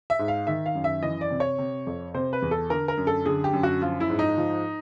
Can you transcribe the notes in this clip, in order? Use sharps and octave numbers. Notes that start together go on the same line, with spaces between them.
E5
G#2
F5
D#3 E5
F5
F#2
E5
E3 D#5
D5
C3
C#5
C3
F2
C3 C5
B4
E2
A4
D3 A#4
A#4
F#2
A4
D3 G#4
G4
F#2
F#4
F3 F4
E4
G#2
D#4
F3